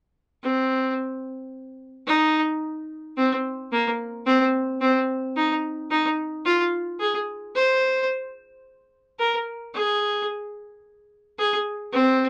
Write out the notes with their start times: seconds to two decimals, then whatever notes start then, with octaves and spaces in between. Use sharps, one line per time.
0.43 C4
2.07 D#4
3.17 C4
3.72 A#3
4.26 C4
4.81 C4
5.36 D#4
5.91 D#4
6.45 F4
7.00 G#4
7.55 C5
9.19 A#4
9.74 G#4
11.38 G#4
11.92 C4